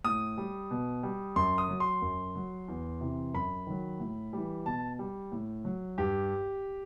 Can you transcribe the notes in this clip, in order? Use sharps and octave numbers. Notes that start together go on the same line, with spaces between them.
A2 D#6
G3
B2
G3
F#2 C6
D#6
F#3
C6
F#2
F#3
E2
C3 E3
F#2 B5
D#3 F#3
A2
E3 G3
B2 A5
G3
A2
F#3
G2 G4